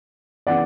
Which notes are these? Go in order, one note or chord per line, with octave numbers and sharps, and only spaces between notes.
C#3 E3 B3 D5 F#5